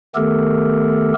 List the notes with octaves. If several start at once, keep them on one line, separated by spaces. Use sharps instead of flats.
D#3 A3 B3 G4 A4 A#4